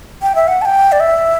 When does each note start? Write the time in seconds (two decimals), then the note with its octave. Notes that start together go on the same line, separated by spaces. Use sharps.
0.22 G5
0.35 E5
0.47 F#5
0.61 A5
0.65 G5
0.92 D5
1.00 E5